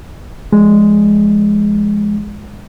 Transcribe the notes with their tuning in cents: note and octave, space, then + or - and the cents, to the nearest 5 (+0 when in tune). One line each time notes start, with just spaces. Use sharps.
F3 -25 G#3 +0